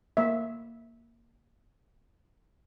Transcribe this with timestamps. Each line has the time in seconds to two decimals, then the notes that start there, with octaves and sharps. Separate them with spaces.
0.17 A#3 E5